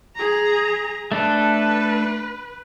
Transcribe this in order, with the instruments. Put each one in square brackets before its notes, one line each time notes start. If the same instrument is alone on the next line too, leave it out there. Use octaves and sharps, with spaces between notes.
[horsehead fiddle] G#4 A#5
[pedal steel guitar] A3 D4 A4 [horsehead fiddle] B4